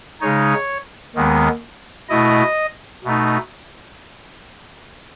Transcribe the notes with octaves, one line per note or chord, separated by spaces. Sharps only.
C#3 G#3 D#4 C#5
D#2 D#3 G#3 B3
B2 A3 E4 D#5
B2 A3 D#4